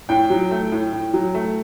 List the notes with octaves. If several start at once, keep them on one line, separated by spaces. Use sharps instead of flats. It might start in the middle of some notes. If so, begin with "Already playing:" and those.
A2 G5
F#3
A3
A2
A2
F#3
A3